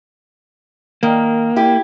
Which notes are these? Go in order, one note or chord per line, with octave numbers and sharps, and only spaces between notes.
D#3 A#3
E4 G4